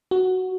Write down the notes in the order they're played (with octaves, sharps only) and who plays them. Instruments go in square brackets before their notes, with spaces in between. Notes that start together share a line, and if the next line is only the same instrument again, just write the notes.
[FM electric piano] F#4